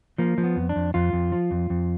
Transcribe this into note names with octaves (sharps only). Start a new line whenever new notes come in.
F3 A#3
F3
B3
F2
D4
F2
F2 F4
F2
F3
F2
F2